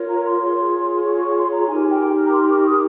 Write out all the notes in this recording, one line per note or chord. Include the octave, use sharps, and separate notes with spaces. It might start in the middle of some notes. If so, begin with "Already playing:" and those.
Already playing: F4 A#4 C#5
A#5
C6
F4 G#4 C#5
C#6
C#6
C6
A#5
D#4 G4 A#4 G#5
G5
A#5
C6
C#6
D#6